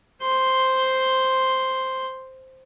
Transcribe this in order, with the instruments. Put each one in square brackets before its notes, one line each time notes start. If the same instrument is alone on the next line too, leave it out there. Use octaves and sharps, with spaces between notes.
[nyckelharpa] C5 C6